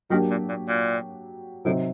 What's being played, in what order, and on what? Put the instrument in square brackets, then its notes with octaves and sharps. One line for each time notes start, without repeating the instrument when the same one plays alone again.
[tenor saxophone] D#3 [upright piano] F#3 A#3 D4 G4
[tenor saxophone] A#2
A#2
A#2
[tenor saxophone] A2 [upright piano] C3 F#3 C4 D#4